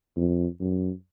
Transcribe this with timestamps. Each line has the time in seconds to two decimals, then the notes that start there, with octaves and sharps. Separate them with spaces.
0.16 F2
0.60 F#2